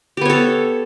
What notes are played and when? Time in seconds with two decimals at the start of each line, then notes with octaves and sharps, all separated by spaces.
0.17 G4
0.21 B3
0.25 C#5
0.30 A4